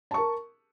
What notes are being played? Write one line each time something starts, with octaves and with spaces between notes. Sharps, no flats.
A#4 A5 C#6